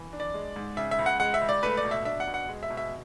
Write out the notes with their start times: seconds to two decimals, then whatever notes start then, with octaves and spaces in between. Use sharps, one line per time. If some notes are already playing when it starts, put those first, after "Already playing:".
Already playing: E3
0.13 D4
0.20 D5
0.34 G#3
0.56 G#2
0.77 C#3 E5
0.91 E5
0.99 C#2
1.06 F#5
1.20 G#3 F#5
1.34 E5
1.42 C#2
1.49 D5
1.63 A3 B4
1.77 D5
1.84 B2
1.91 E5
2.05 D4 E5
2.20 F#5
2.27 B2
2.34 F#5
2.49 G#3
2.63 E5
2.70 B2
2.77 E5